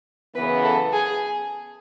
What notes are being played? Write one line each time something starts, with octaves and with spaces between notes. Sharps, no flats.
F#2 C#3 E3 B3 B4
A4
G#4